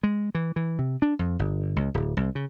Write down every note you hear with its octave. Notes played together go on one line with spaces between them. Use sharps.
G#3
E3
E3
C3
D4
F2
G1
C#2
D1
C2
C#3